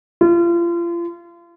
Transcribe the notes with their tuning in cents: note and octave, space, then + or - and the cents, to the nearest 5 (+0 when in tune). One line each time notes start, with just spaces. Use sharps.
F4 -35